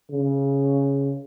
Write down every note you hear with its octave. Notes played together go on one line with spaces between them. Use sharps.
C#3